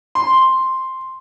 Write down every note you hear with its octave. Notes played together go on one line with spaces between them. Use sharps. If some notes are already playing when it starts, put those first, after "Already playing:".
C6